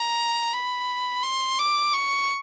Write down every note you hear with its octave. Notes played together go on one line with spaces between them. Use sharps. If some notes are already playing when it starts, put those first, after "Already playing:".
Already playing: A#5
B5
C6
D6
C#6